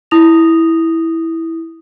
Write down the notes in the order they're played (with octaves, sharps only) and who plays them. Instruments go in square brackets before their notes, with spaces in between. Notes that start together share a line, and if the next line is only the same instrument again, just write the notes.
[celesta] E4 D#6 A#6 F7